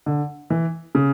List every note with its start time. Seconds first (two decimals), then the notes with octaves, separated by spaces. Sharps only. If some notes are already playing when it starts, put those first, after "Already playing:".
0.06 D3
0.50 E3
0.95 C#3